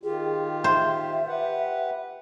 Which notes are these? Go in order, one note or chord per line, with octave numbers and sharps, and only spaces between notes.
D#3 F4 G4 G#4
C5 E5
G4 B4 F#5